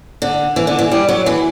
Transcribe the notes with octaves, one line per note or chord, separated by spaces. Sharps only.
D3
E3
D3
E3
G3
F#3
E3